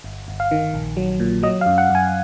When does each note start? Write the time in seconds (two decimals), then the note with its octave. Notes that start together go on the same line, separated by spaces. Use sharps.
0.04 G1
0.28 G1
0.40 F5
0.51 D#3
0.74 A#1
0.97 F#3
1.20 A#2
1.43 F#3 D#5
1.61 F5
1.66 F#2
1.78 F#5
1.90 F#2
1.95 G#5